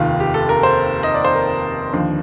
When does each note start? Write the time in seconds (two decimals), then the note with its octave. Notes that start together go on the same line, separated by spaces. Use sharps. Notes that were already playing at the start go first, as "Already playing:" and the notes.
Already playing: F1 D#2 D#3 F4
0.20 G4
0.34 A4
0.49 A#4
0.63 C5
1.03 D#5
1.14 D5
1.24 C5
1.35 A#4
1.93 D#2 D3 F3 C5